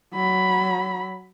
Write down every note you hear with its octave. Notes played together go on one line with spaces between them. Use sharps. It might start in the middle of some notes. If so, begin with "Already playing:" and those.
F#3 B5